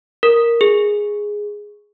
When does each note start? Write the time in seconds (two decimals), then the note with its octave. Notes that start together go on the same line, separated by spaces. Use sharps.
0.23 A#4
0.61 G#4